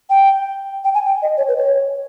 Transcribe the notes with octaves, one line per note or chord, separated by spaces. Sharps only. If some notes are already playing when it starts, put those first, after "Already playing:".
G5
G5
G#5
G5
D#5
C#5
B4
C#5